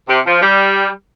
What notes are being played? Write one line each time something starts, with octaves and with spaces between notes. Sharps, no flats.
C3
F3
G3